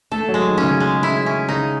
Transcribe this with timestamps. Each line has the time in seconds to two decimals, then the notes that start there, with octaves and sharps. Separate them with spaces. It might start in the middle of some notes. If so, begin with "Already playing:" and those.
0.12 A3 A4
0.29 F#3
0.34 G#3
0.46 D#3
0.57 C#4
0.63 C#3
0.80 G#3
1.03 E4
1.26 C#4
1.49 C#3 D#4